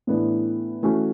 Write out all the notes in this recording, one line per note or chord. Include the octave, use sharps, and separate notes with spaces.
A2 E3 B3 D4
E3 A3 C#4 F#4